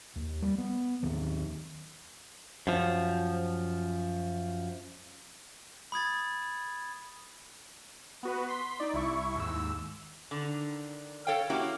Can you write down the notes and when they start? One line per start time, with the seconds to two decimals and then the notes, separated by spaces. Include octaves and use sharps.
0.16 D#2
0.42 G3
0.58 B3
1.03 D#2 D#3 F#3
2.67 F#2 F3
5.92 B5 D#6 G#6 A6
8.23 B3 F#4 B4
8.49 C6 B6
8.80 D#4 D5
8.93 C2 E4 C#6
9.36 D#2 G#2 E6
10.31 D3 D#3
11.27 A4 C#5 F5 G5
11.50 A#3 C#4 E4 F#4 G4